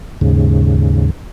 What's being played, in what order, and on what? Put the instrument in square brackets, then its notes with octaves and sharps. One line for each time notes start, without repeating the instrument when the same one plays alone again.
[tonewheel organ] D#2 G#2 C#3